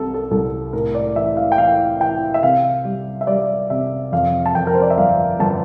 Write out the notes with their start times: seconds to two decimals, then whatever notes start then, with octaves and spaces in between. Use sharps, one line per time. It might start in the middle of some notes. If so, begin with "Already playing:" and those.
Already playing: C2 C3 A4
0.14 A4
0.31 C2 A4
0.73 A2 A#4
0.95 D5
1.16 E3 E5
1.37 F5
1.52 G5
1.58 E3 F5
2.00 E3 G5
2.34 E5
2.43 C3 F5
2.85 G3
3.21 E5
3.27 G3 D5
3.70 C3 E5
4.12 F2 F5
4.46 A5
4.55 F2 G5
4.67 A#4
4.75 C5
4.82 D5
4.90 E5
4.97 G1 F5
5.40 G1 A5